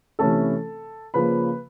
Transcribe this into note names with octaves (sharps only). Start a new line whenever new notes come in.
C3 E3 A3 C#4 E4 A4 A5
C#3 F3 A#3 B4 B5